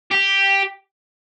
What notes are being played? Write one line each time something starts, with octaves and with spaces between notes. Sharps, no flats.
G4